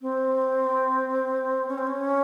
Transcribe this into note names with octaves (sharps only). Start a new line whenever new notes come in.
C4
C#4
C4
C#4